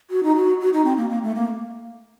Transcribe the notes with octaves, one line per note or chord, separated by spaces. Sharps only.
F#4
D#4
F#4
F#4
D#4
C4
A#3
A#3
A3
A#3